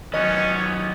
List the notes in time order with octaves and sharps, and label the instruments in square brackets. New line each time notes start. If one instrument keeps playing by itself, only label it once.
[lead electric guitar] D#3 F#3 [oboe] B3 [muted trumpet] C#4 [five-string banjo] D#5